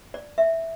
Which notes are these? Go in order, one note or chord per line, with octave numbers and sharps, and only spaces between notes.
D5
E5